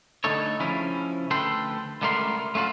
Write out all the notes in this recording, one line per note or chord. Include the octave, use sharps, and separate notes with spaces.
D3 G3 A3 D#4 A4 C#5
C#3 F3 C#4 E4
D2 A4 B4 G5 C6
C#2 D3 G3 A3 A#4 C6
A3 C#4 F4 F#4